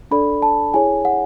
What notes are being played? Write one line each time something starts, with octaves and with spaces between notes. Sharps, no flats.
D4 A4 D5 B5
A5
E4 G#4 C#5 G#5
F#5